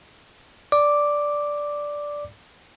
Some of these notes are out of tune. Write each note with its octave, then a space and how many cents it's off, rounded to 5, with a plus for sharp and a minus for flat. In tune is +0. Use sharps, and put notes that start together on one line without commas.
D5 -5 D6 +0